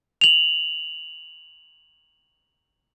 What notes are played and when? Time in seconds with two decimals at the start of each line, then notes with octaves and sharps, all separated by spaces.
0.21 F7 F#7